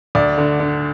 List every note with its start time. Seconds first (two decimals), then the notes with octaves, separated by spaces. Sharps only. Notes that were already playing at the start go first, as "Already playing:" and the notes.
0.15 D2 D5
0.38 D3
0.60 D3